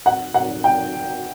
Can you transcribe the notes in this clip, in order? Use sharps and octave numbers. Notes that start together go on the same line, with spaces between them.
F#5
F#5
G5